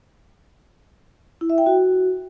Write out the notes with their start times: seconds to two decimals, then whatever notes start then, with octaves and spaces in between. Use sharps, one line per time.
1.41 E4
1.50 E5
1.58 G5
1.66 F#4